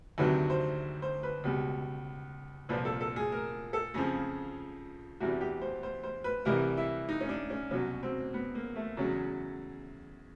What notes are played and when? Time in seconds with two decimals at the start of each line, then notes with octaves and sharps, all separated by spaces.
0.18 D2 C3 D#3 F#3 B4
0.50 C5
1.02 C5
1.23 B4
1.44 C#2 B2 G3
2.69 C2 A#2 F3 B4
2.85 A4
3.01 A4
3.16 G#4
3.32 A#4
3.73 A4
3.94 F2 C#3 F3 G#4
5.20 E2 C3 E3 G3 F#4
5.41 G4
5.62 C5
5.83 C5
6.04 C5
6.24 B4
6.45 C2 C3 E3 G3 A#4
6.77 E4
7.09 D#4
7.21 C#4
7.29 D4
7.50 C#4
7.71 C2 B2 F#3 C#4
8.03 C4
8.34 B3
8.55 A#3
8.76 A3
8.97 E2 C#3 F#3